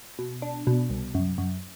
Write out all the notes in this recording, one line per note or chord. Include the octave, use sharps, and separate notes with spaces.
B2
D4
B2
C2
F#2
F#2